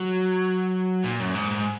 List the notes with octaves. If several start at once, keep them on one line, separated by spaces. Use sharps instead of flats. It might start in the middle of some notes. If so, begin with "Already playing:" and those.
Already playing: F#3
A#2
F#2
G#2
G#2